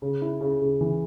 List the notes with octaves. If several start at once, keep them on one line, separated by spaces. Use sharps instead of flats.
C#3
E4
C#3
C#3
E3